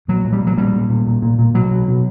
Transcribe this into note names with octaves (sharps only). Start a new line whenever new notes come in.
A#2 F#3
A#2
G3
A#2
F#3
A#2 G3
A#2
A#2
A#2
A#2
A#2
B2 F#3
B2
B2